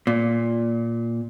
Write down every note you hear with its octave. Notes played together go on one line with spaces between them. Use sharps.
A#2